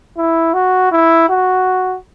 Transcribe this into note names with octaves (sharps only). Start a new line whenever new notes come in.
E4
F#4
E4
F#4